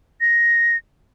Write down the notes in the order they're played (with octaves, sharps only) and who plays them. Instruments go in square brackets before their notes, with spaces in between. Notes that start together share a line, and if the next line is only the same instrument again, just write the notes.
[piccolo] A#6